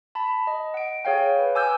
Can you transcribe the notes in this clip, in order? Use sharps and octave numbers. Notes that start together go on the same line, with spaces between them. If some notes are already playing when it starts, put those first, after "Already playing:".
A5 B5
D#5
F#5 D7
G#4 C#5 F5 G5
B4
G#5 D6 E6 F6 G6